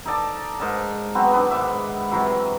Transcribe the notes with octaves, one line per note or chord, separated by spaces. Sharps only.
D#4 A4 D5 A5
G#2 A#4 D#5 A5
F#3 B3 C4
B3 D4
G#2 D#3 E5 D6
C3 E3 F#3